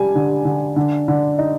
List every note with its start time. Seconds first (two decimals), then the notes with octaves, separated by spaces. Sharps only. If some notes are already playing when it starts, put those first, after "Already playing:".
Already playing: G3 D4 G#5
0.15 D3
0.45 D3
0.76 D3
1.08 D3
1.38 D#4